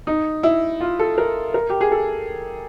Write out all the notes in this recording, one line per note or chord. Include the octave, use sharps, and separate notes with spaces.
D#4
E4
F4
A4
A#4
A#4
G4
G#4
A4